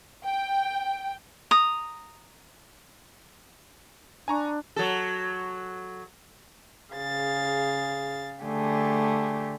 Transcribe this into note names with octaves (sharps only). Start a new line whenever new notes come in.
G5
A#5 D#6
D4 G#5 A#5 C#6
F#3 A4
C#3 G#4 F5 A6
D3 A3 G4 G#4